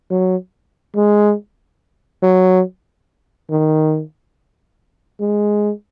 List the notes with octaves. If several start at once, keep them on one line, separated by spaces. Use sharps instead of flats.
F#3
G#3
F#3
D#3
G#3